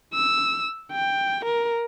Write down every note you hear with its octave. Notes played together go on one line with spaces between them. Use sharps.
E6
G5
A#4